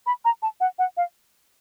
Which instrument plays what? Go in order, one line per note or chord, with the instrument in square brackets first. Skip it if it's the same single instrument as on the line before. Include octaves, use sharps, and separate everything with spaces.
[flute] B5
A#5
A5
F#5
F#5
F5